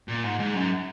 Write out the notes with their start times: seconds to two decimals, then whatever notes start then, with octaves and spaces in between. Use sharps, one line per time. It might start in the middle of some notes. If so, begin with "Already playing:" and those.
0.08 A#2
0.24 G#2
0.40 G#2
0.54 F#2